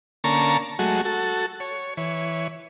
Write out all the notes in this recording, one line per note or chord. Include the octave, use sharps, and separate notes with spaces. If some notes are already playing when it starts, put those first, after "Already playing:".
D3 A#3 C#4 A5 A#5 C#6
F#3 G#3 A3 F#4
F#4 A4
C#5
E3 C#5